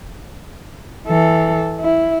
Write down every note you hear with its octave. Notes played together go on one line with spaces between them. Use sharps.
E3 A4
E4